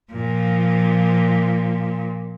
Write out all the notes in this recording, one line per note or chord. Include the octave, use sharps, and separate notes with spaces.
A#2 F3